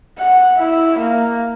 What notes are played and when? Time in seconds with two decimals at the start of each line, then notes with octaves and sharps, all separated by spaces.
0.18 F#5
0.59 E4
0.99 A#3